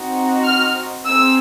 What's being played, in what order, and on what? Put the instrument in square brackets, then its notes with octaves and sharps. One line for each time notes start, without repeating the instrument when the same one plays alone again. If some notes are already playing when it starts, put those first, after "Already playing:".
Already playing: [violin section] C4 D#4 F#4
F6
C4 D#4 G#4 E6